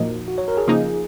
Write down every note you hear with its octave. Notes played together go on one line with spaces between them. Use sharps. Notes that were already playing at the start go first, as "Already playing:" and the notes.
Already playing: A#2 F3 A#3 D#4 F#4
F#4
C#5
A#4
G#4
C#3 F3 A#3 D#4